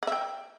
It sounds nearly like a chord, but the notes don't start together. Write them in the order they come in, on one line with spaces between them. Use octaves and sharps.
F#5 E5 G5